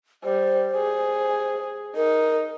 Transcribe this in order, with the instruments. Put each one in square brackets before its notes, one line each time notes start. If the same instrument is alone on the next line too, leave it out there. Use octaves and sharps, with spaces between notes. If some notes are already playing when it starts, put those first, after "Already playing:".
[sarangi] G3 [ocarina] C5
[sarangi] G#4
[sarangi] D#4 [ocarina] A#4